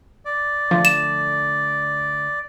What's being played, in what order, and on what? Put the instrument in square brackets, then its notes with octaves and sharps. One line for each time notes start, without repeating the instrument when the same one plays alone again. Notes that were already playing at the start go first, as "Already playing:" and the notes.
[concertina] D5
[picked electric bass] D3 A3 [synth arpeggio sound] F3
[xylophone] E7